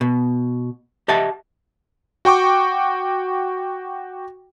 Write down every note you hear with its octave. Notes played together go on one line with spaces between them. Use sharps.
B2
G4 D#5 E5 F#5 A5
F#4 G5 C#6 D6